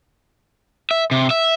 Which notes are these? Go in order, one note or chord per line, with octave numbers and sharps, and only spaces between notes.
E5
C3
E5